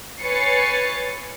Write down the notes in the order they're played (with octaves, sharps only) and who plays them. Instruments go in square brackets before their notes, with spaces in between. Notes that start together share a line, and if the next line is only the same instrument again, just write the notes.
[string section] B4 C#5 G#5 A6 C7 C#7